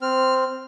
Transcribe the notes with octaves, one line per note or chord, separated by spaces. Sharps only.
C4 F6